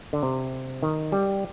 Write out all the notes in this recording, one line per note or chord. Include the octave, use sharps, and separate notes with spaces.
D3
C3
D#3
G3